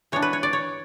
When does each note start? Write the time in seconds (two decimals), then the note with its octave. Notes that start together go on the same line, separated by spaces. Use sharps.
0.12 E3 B3 D4 C#5
0.22 B4
0.33 C#5
0.43 D5
0.53 C#5